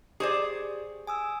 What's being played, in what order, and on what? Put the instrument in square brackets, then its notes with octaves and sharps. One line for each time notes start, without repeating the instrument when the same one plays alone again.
[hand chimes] G4 [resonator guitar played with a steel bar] G#4 C5 D5
[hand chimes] G#5 D#6 E6